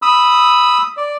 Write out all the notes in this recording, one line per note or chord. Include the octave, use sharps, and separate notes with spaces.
B5 D#6 E6
D5